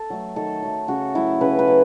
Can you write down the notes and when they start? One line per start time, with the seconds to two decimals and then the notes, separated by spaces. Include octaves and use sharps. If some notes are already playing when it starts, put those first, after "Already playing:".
Already playing: A4
0.10 F#3 A3
0.36 D#3 A4
0.63 F#3 A3
0.88 C#3 F#4
1.15 F#3 A3 E4
1.41 C#3 B4
1.59 B4
1.68 F#3